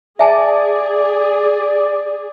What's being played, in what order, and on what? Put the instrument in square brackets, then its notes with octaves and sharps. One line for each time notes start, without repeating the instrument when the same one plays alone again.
[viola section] G#4 [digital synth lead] D5 [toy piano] E5 G#5 A5